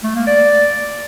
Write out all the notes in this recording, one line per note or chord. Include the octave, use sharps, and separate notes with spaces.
A3
A#3
D5